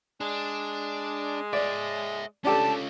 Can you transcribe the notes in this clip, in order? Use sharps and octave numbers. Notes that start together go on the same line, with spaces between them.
G#3 D4
C#5 D5 E5
C#4 D4 F4 G4 A4 A5